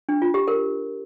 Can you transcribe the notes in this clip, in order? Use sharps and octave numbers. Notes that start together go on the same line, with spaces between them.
D4
F4
G4
A#4